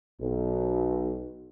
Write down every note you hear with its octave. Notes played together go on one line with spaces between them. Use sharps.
B1